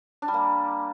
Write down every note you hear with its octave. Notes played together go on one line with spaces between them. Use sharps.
D4
G3
A#3